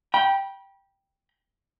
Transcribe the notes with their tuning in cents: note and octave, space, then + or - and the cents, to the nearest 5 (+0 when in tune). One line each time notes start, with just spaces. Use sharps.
G5 +0 B5 -35